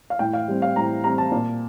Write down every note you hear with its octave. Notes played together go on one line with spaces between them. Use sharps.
F5
A2 G5
F5
G3 C4
F5
A2 A#5
G3 C4 A#5
A5
A#2